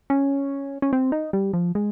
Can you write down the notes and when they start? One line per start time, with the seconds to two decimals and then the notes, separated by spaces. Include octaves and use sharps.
0.10 C#4
0.82 C#4
0.93 C4
1.12 D#4
1.33 G3
1.53 F3
1.75 G#3